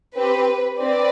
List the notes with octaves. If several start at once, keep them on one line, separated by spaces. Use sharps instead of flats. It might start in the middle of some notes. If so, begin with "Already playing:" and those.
C4 G4 B4
C4 B4 D5